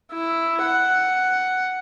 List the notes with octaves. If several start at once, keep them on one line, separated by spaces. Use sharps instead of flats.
E4
F#5